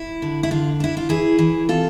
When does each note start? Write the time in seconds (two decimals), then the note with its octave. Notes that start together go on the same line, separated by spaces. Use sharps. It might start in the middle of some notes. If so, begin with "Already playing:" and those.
Already playing: E4
0.22 D3
0.43 E4
0.51 D3 F4
0.80 D4 E4
0.97 F4
1.09 E3 E4 G#4
1.39 E3
1.69 C3 F4 A4